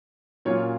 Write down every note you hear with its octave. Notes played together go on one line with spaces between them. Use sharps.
A#2 F#3 C#4 F4 C#5